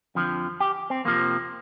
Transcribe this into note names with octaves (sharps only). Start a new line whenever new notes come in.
F2 D3 F3
G4
C4
F2 C3 F3 A#3